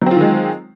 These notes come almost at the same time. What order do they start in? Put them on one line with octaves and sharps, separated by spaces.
F#3 C4 F4 D#3 G#3